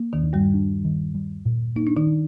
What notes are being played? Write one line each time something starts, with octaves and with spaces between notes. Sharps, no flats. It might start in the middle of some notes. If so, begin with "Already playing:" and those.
Already playing: A#3
D#2 D#3
D#3
G2 G3
D4
D#3
G3
A#2
A#3 D#4
D4
D#3 D#4
D4